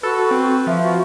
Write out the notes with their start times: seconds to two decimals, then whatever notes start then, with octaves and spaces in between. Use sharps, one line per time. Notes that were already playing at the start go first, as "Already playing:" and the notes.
0.03 F#4 A4 B4
0.31 C4
0.67 F3 E5
0.83 F#4